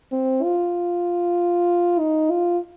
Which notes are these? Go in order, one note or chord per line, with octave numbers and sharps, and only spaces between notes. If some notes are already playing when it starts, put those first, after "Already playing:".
C4
F4
D#4
F4